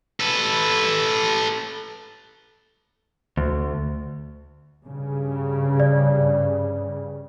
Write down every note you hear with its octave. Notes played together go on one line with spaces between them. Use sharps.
A4 B4
D2
G2 C#3
D5